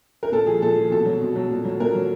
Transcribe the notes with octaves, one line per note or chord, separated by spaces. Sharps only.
A#4
A#2 A4
F3 G#4
A#2 A4
F3
B2 A4
F#3
B2
F#3
A#2
F#3
A#2 A#4
F#3